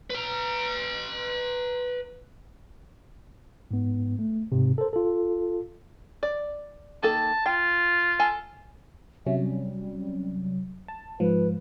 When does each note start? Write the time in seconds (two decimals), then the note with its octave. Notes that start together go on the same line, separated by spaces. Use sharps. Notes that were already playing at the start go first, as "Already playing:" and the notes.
0.10 B4 A#5
3.71 G#2 B3
4.19 A3
4.52 G#2 C3
4.78 A4 A#4 C5
4.93 F4 A4
6.23 D5
7.03 D#3 A#3 A4 A5
7.46 F4 G5
8.19 A4 G#5
9.26 C3 F#3 C#4 E5
9.39 G3
10.88 A5
11.20 G#2 F3 B4